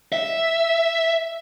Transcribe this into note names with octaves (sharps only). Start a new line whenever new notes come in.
E5